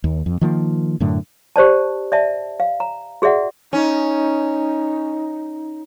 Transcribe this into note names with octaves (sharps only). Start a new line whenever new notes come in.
D#2
F2
D#3 F3 A#3
F#2 A2 D3
G4 C5 D5 A5
D5 E5 A5
F5
A#5
F#4 G#4 D5 E5 F#5
C#4 D#4